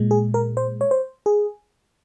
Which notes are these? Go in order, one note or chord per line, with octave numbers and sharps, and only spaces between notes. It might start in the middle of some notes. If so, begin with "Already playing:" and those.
Already playing: A#2 G#3
G#4
A#4
C5
C#5
C5
G#4